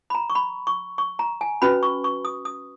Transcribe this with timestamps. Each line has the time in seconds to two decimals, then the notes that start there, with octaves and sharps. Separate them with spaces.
0.10 B5
0.15 A#5
0.30 C#6
0.35 B5
0.67 C#6
0.98 C#6
1.19 A#5
1.41 G#5
1.62 C#4 F#4 B4 B5
1.83 C#6
2.04 C#6
2.25 D#6
2.45 D#6